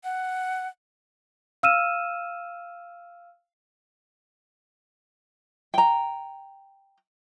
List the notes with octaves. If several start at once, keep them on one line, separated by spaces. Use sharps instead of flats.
F#5
F5 E6 F6 D#7 E7
G5 A#5